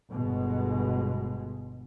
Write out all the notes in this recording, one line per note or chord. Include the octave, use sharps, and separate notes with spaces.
G1 B2 G#3